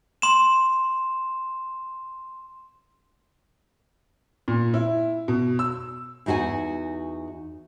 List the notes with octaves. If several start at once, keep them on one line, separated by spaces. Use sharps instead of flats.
C6 E7
A#2
E4
B2
E6
E2 D#4 F#4 F#5 G#5